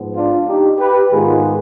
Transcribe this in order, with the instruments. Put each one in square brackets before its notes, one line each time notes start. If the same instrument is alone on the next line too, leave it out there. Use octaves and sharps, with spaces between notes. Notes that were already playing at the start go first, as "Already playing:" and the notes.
Already playing: [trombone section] G#2 F3 B3
D4 F4
D#4 G4
G4 B4
G#2 D#3 G#3 B3 F4 G#4